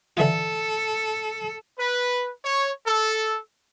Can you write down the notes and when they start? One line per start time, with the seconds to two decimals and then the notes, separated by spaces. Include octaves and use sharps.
0.17 D3 E3 F4 A4
1.78 B4
2.45 C#5
2.86 A4